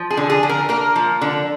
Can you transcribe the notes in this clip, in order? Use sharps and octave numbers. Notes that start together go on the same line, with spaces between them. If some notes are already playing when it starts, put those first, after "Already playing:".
Already playing: F3
G#4
D3
G#4
D3
A#4
A#3 A#4
F3
D3